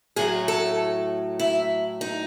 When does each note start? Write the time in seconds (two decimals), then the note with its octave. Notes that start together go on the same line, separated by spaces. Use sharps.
0.16 A2 F#3 A3 G#4
0.48 A4
1.39 E4
2.01 D#4